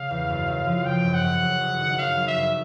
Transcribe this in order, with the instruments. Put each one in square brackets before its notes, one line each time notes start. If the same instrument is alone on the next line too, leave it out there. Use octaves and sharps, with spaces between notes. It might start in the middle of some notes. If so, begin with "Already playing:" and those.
Already playing: [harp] C#3 [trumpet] F5
[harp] E2
F#2
F#2
F3
[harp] C#3 [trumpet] G5
[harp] F#2
[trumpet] F#5
[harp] F#2
F#3
F#1
D#3
[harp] F#2 [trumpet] F5
[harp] F#3
[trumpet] E5
[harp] F#1